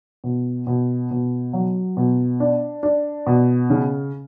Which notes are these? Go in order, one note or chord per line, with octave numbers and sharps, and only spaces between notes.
B2
B2
B2
F#3
B2
D4
D4
B2
C#3